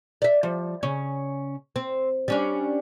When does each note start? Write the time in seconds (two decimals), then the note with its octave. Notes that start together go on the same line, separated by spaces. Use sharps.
0.22 D5 E5
0.43 F3 G3
0.83 C#3 C#4
1.76 C4
2.28 G3 C#4 D4